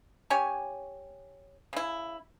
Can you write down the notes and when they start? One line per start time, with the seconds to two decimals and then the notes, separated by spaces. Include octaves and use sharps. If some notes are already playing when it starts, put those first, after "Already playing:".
0.30 C#4 G4 C#5 G#5
1.73 C#3 E4